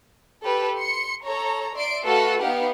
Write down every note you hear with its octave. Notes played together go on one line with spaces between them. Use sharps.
G4 A4 B4
C6 C#7
A4 C#5 A#5
D5 E5 C6 C7 D7
A3 F#4 A4 B4 F5 F#5
B3 D#4 G4 F5 F#5